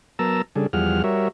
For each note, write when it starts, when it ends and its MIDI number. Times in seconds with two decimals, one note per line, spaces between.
0.19 0.42 54
0.19 0.42 59
0.19 0.42 70
0.19 0.42 81
0.19 0.42 82
0.19 0.42 88
0.56 0.67 49
0.56 0.67 55
0.56 0.67 62
0.56 0.67 68
0.56 0.67 69
0.73 1.02 40
0.73 1.02 53
0.73 1.02 55
0.73 1.02 68
0.73 1.02 78
0.73 1.02 89
1.04 1.28 55
1.04 1.28 66
1.04 1.28 70
1.04 1.28 73
1.04 1.28 76